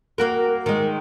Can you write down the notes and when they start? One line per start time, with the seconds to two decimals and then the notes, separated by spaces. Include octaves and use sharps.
0.18 A#3 F#4 A#4
0.66 D#3 G#3